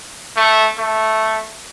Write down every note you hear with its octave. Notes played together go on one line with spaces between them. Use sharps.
A3
A3